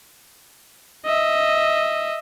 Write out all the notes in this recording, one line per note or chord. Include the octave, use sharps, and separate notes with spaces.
D#5 E5